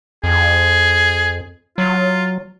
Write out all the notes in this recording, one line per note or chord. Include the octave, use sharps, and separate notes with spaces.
F2 G#4
F#3 F4